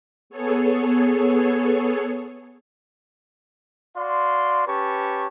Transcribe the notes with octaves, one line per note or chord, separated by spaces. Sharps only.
B3 G#4 A4 C#5
F#4 D5 F5 C6
C#4 G4 B4 C#5 A5 C#6